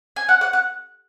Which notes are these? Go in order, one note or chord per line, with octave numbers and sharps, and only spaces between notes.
G#5
F#5
F#5
F#5